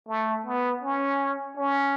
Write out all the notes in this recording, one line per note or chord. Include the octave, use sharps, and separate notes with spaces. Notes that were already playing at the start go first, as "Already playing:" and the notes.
A3
B3
C#4
C#4